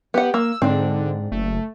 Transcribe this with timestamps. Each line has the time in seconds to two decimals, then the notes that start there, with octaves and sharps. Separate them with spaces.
0.14 B3 G4 F#5
0.34 A#3 E6
0.62 G#2 D3 C4 D4
1.32 F#1 A3